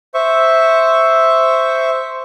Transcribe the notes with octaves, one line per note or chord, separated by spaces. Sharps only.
C5 E5 C#6